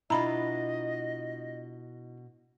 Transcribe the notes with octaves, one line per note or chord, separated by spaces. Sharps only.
B2 D4 E4 F4 D#5 A#5 B5